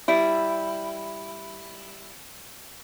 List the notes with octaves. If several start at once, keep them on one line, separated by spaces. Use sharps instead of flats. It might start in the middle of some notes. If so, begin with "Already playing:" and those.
G3 E4